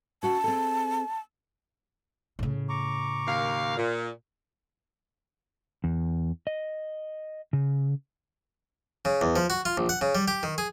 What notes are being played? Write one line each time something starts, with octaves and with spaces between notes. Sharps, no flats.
C#4 F#4 F#5 A5
C4 G#4 A4
A2 C#3
A#5 C#6 D6
D#2 A#4 F5
A#2
E2
D#5
C#3
C#3
E2
F3
F#4
F4
A#1
F#5
C#3
G3
G4
D#3
G#4